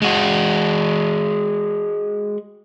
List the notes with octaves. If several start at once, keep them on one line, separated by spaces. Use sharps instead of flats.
G#3 F#4